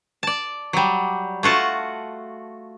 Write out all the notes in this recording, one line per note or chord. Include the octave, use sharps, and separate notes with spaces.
D5 A5
F#3 G3
A3 F4 F#4 A5